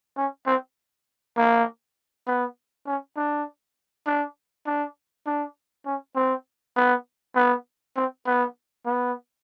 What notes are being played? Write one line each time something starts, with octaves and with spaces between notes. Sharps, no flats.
C#4
C4
A#3
B3
C#4
D4
D4
D4
D4
C#4
C4
B3
B3
C4
B3
B3